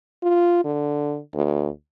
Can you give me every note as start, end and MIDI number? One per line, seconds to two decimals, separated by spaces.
0.23 0.63 65
0.64 1.19 50
1.34 1.68 38